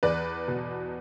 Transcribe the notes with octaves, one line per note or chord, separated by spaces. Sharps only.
E2 B4 D5
B2